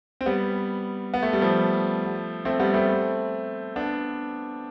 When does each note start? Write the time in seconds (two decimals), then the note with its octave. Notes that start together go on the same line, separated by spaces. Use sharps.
0.21 C4
0.26 G3 B3
1.14 B3
1.23 A3
1.33 G3
1.41 F3 A3
2.45 A3 C4
2.60 G3 B3
2.74 A3 C4
3.76 B3 D4